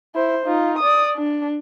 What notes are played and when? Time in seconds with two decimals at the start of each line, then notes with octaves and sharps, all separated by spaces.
0.15 E4 C5
0.46 D#4 F4
0.79 D5 D#6
1.16 D4